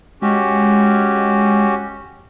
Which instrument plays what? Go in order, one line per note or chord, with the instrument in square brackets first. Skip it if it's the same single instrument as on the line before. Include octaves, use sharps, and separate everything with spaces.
[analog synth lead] G#3 [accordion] C#4 F#4 G4